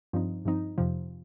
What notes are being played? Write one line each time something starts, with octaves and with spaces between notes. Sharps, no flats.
G2 F3 C4 D#4
G2 F3 C4 D#4
F2 C3 F3